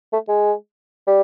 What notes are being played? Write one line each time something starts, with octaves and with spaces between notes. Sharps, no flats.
A3
G#3
G3